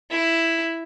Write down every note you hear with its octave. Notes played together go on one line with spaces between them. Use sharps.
E4